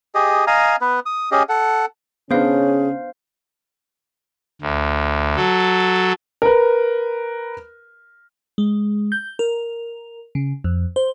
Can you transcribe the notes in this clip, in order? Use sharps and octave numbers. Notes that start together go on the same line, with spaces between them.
G4 G#4 D#5
D#5 F5 G#5 A#5
B3 B4
D#6
C#4 G4 G#4 D#5
A4 F#5
C#3 B3 C#4 D4 G#4 C5 F5
D2
F#3 A4
A#4 B4
G#3
G6
A#4
C#3
F2
C5